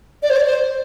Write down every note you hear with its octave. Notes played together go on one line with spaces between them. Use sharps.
D5
C5
D5
C5